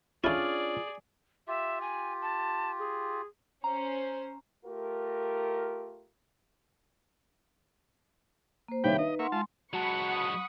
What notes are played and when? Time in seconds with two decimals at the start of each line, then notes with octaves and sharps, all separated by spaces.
0.24 C#4 D4 E4 F4 G#4 A4 C#5 D5
1.48 F4 G4 E5
1.81 G#5
2.22 A5
2.79 G#4
3.64 C#4 C5 A#5
4.65 A3 F4 G4 A#4
8.68 A#3 C5
8.84 C2 D#3 G4 B4 C#5 E5 F5 G5
8.98 D#4 B4 D#5
9.19 A#3 E5 F#5 C6 C#6
9.32 G#3 F4 A5 C6
9.73 F#3 G#3 F#4 F#5 A5 B5 C#6
10.14 D#6